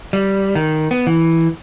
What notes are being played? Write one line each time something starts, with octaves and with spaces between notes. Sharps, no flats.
G3
D#3
B3
E3